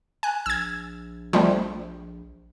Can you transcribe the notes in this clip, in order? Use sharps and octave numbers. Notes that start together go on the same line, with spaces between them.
G#5 F#6
A#1 E6 G#6
F3 G3 A3